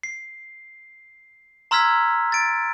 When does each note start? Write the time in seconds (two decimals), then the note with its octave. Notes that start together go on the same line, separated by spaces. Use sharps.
0.03 C7
1.71 A#5 C6 E6 F6 G#6 B6
2.32 A6 D7